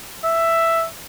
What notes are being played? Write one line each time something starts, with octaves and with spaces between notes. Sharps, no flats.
E5